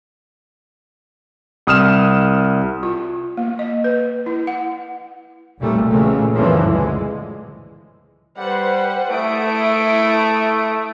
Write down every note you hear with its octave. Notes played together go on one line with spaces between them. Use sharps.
C2 D#6 F6 E7
F4
A#3
D#5
B4
E4
F#5
F1 B1 A#2 G3 A3
A#2 C#3 E3 G#3 A3
F#2 A2 D3 E3 F3
C#2 G#3
G3 B4 C5 F#5
A3 E4 D#6 D7